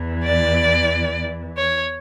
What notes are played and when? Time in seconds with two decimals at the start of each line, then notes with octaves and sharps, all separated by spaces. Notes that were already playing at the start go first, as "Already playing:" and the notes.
Already playing: E2 E3
0.23 D5
1.57 C#5